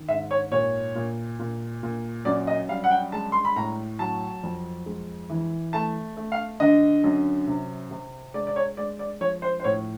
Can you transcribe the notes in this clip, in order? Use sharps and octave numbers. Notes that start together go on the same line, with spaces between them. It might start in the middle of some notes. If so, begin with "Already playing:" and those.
Already playing: D#3
G#2 E5
C#5
A#2 C#5
A#2
A#2
A#2
F#2 D5
D#5
G3 F5
F#5
G5
G#3 A5
C6
B5
A2 A#5
F#3 A5
F2
G#3
E3
A3 A5
A3
F5
D3 D#5
F#2
C3
C3
G#3 D5
D5
C#5
G#3 D5
D5
F3 C#5
C5
C5
A2 C#5